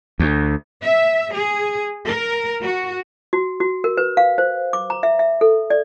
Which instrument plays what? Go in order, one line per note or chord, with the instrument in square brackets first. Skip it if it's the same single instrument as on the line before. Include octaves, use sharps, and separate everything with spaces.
[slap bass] D2
[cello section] E5
G#4
A#4
F#4
[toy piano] F#4
F#4
A#4
B4
F5
C5
D6
A#5
E5
E5
A4
D5